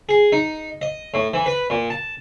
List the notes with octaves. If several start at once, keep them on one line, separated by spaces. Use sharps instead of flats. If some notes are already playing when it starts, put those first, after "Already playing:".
G#4
D#4
D#5
A2
E3
B4
A#2
A5